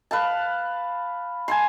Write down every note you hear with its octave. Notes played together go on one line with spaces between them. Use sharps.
B4 F5 A5
G#5 A5 C6